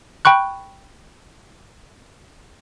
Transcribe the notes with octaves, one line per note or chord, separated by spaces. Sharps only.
G5 B5 C#6 F#6